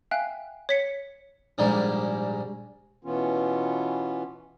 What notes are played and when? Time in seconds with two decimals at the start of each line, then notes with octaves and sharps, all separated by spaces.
0.11 E5 F5 G5 G#5 F#6
0.69 C#5 B6 C#7
1.58 A#1 G#2 G3 G#3 A#3
3.04 B2 E3 B3 C#4 F4